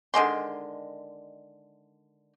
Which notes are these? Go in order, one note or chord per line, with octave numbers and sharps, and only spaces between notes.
D3 D#3 G#3 C6